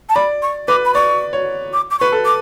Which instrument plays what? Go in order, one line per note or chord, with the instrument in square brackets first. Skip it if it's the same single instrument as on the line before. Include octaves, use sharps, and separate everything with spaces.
[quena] A5
[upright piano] D5 [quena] B5
[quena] C#6
[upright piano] B4 [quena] D6
[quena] B5
[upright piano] D5 [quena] C#6
[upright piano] C#5
[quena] D6
D6
[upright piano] B4 [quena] C#6
[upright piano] A4
[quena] D6